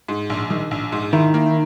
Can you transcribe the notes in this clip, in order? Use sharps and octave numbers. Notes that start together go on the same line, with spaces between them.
G#2
A#1
D#3
A#1
G#2
D#3 E4
A#3